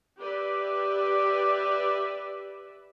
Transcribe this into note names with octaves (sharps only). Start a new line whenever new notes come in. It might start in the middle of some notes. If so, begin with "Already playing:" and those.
G4 B4 D5 E5